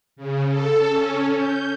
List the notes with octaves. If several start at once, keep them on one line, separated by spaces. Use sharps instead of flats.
C#3
A4
C#4
G6